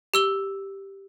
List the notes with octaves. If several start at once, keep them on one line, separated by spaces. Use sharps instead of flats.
G4 E6 G7